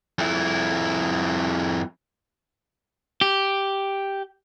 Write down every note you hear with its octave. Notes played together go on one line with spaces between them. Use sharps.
F2 E4
G4